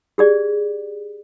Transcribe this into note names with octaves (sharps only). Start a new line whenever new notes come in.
G4 G#4 D5